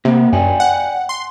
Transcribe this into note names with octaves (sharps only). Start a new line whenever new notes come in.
C3 A#3 B3
F#2 D5 G5 G#5
F#5
C6